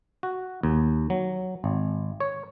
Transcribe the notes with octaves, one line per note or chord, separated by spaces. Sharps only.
F#4
D#2
F#3
G#1
C#5